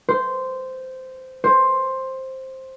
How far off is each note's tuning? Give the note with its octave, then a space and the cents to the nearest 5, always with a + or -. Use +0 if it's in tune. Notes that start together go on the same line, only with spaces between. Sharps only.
C5 -10
C5 +10